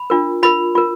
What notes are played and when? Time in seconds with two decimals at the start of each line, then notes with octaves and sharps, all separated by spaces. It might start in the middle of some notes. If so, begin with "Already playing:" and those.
Already playing: B5
0.10 D4 F4 A#4
0.43 F4 A#4 B5
0.75 F4 A#4